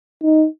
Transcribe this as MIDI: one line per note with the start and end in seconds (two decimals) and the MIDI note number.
0.23 0.46 63